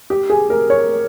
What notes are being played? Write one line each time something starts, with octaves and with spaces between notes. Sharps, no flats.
G4
G#4
A#4
C#5